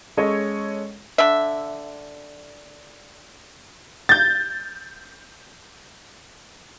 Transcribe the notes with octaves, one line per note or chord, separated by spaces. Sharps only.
G#3 C#4 G#4 A4 C#5 D#5
D3 E5
G6 A6